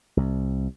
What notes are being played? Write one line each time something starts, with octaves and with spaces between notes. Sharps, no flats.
C2